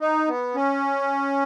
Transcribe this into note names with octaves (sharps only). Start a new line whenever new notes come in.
D#4
B3
C#4